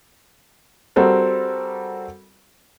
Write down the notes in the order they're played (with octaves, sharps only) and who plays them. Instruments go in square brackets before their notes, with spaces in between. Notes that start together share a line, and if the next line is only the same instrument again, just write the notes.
[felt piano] G3 C4 F#4 A4 A#4